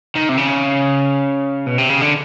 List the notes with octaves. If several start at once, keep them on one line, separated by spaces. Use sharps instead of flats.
D#3
C3
C#3
B2
C3
C#3
D3